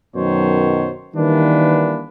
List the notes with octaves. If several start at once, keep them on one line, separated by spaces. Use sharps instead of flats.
F#2 B2 D#3 F#3 C5 C#5
D#3 E3 G3 A#3 D4 B4